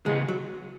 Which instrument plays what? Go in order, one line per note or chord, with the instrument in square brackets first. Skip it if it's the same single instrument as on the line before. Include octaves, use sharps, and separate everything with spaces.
[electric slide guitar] C#3 E3 B3 G#4 [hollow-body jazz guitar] G#3
[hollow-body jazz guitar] F#3